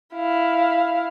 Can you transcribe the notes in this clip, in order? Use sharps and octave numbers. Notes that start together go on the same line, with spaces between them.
E4 F5